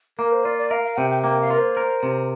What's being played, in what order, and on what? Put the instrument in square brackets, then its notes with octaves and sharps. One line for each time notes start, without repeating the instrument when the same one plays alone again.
[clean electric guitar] A#3 [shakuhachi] A#4
[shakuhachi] C5
[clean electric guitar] F4 [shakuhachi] D5
[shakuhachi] D5
[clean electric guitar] A#4 [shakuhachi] F5
[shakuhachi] F5
[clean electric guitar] C3 [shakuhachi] G5
[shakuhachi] G5
[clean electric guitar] A#3 [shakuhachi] G5
[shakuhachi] F5
[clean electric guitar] F4 [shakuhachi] A#4
[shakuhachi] C5
[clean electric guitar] A#4
C3